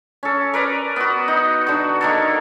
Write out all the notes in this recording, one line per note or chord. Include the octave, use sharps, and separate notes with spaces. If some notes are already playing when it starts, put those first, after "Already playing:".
C#4 A4
A#4 B4 D5
B3 F#4
D#4
D3 F#4
D#3 A#3 A4